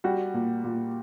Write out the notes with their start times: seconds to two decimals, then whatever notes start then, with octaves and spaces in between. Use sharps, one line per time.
0.04 G3 F#4
0.34 A#2
0.64 A#2